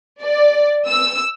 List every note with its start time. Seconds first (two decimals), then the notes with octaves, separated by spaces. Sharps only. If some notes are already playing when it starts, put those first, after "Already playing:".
0.22 D5
0.87 E6